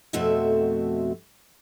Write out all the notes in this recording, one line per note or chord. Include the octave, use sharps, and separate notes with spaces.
F2 B2 A3 C4 F#4 E5